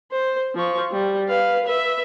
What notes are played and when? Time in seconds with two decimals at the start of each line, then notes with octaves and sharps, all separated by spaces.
0.12 C5
0.55 F3 C#6
0.92 G3
1.28 B4 F5
1.65 B4 E5